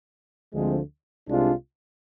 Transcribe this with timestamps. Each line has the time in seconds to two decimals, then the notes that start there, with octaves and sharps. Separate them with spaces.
0.54 D2 D3 F3 G#3 C4
1.26 C2 C3 G#3 D4 F4